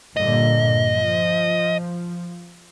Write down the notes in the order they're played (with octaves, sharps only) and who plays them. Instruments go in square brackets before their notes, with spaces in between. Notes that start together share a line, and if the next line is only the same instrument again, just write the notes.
[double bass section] G2 A#2 D3 [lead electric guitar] D#5
[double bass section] F3